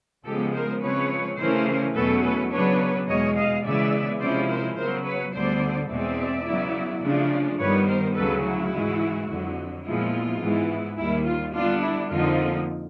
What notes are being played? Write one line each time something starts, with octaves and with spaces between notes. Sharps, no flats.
C#3 F3 G#3 B3 G4 A4
A#4 C5
C#3 F3 G#3 C4 B4 C#5
C#3 E3 A3 C#4 A#4 C5
E2 B2 F#3 A3 C#4 A4 B4
A4 B4
C#3 F#3 B3 D4 B4 C#5
E2 B2 G#3 C#5 D#5
D#5 F5
C#3 E3 G#3 B3 D5 E5
C3 F3 G#3 C#4 E4 C5 D5
A#4 C5
C#3 F#3 B3 A#4 C5
B4 C#5
D2 D3 G3 B3 C5 D5
E2 B2 G#3 C4 D5 E5
C#3 F#3 B3 E4
C#3 F3 A3 D4
G2 D#3 G3 B3 B4 C#5
A#4 C5
D2 C#3 F#3 A4 B4
E4 F#4
G#2 E3 G#3
F2 D3 F#3
A#2 F3 G#3 B3 E4 F4
G#2 E3 G#3 B3 E4
D#2 D#3 G3 E4
F4
D3 G3 B3 D4 F4
E4
F2 D3 F3 A#3 D#4 F4